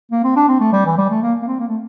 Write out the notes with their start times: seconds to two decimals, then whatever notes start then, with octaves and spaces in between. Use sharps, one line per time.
0.11 A#3
0.24 C4
0.36 D4
0.48 C4
0.60 A3
0.73 G3
0.86 E3
0.98 G3
1.10 A3
1.22 A#3
1.42 A#3
1.47 C4
1.60 A#3
1.68 A3